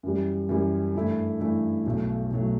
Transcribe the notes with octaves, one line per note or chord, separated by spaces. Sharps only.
F#2 E3 G3
F#2 E3 G3
G2 E3 A3 E4
G2 E3 A3 E4
B1 B2 F#3 A3
B1 B2 F#3 A3